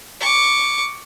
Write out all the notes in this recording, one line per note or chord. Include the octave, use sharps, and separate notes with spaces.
C#6 D6